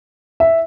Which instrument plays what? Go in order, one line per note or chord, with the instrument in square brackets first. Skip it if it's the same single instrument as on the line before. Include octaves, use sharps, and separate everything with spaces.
[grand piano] E5